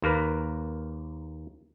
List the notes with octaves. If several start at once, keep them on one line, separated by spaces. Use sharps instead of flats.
D#2 A#3 A#4 B4